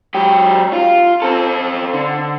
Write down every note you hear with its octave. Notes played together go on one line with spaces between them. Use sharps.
F#3 G4
F4
C4 A4
D3